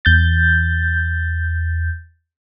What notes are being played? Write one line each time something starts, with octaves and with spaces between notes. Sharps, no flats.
E2 G6 A6